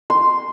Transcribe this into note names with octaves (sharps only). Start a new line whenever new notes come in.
C6